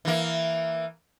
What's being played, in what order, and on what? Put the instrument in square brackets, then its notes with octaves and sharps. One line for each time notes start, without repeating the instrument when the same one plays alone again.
[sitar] E3 A#3